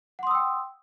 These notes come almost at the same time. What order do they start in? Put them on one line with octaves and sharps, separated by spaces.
F#5 C6 D#6 E6 G5